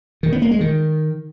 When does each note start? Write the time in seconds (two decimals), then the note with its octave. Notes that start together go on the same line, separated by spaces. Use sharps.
0.23 D#3
0.32 B3
0.42 A#3
0.51 G#3
0.61 D#3